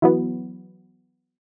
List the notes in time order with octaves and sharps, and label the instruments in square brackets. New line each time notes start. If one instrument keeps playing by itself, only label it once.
[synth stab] E3 F#3 B3